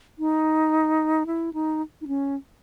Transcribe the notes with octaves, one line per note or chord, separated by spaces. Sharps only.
D#4
E4
D#4
D#4
C#4